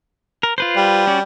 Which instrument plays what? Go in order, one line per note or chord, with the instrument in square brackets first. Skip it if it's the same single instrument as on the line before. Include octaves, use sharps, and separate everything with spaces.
[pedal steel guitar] A#4
F4 B4 C5
[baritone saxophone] G3
[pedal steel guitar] C#4 F#4 D5